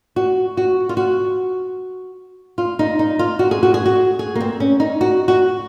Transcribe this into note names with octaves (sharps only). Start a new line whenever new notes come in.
F#4
F#4
F4
F#4
F4
D#4
D#4
F4
F#4
G#4
F#4
G#4
F#4
G#4
A#3
C4
C#4
D#4
F#4
F#4